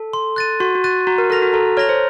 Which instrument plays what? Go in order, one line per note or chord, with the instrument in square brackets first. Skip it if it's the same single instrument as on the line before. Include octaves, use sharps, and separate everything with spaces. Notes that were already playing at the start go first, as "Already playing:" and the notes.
Already playing: [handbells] A4
[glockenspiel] C6
F#6 A6 D#7
[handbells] F#4 [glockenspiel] C6
[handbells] F#4
[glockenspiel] F#6 A6 D#7
[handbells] F#4 [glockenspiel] A#5
[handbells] A#4
[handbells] A4 [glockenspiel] F6 A#6 F7
[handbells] F#4
[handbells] A4 [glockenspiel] A#5
[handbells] A4
[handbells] C#5 [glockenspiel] F6 A#6 F7
[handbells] C5